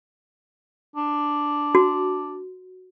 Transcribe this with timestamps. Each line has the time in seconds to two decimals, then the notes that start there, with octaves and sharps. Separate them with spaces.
0.96 D4
1.75 F#4